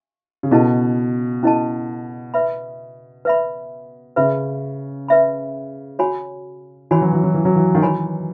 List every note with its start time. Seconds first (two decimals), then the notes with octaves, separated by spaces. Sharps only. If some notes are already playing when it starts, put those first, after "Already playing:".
0.43 C#3
0.51 B2 C#4 E4 A4 D#5 A5
1.43 C#4 E4 A4 D#5 A5
2.34 B4 E5 B5
3.25 B4 E5 B5
4.16 C#3 B4 E5 B5
5.08 B4 E5 B5
5.99 F#4 C#5 G#5 B5
6.91 E3 F#4 C#5 G#5 B5
7.02 F#3
7.13 E3
7.23 F#3
7.34 E3
7.45 F#3
7.56 E3
7.75 D#3
7.82 E3 F#4 C#5 G#5 B5